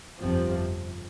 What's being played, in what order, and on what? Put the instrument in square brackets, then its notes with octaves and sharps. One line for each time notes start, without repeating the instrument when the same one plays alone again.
[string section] G1 F2 C3 F3 C4